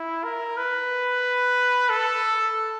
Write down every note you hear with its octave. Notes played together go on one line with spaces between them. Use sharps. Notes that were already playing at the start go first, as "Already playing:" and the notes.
Already playing: E4
A#4
B4
A4